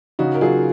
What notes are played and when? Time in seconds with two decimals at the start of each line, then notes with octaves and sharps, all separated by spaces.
0.19 C#3 D#4 F#4
0.34 A#4
0.41 F#3 F4 G#4